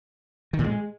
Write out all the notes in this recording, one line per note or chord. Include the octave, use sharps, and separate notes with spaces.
D#3
A#2
G#3